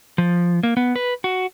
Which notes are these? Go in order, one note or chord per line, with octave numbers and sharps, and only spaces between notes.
F3
A#3
B3
B4
F#4